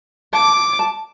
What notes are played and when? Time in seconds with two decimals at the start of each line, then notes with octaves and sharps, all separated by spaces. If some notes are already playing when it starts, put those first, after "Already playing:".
0.33 A5 D6
0.79 A5